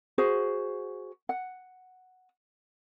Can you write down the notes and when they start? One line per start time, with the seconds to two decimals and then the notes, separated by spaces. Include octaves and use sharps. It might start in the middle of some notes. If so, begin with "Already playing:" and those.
0.18 F#4 G#4 C5
1.29 F#5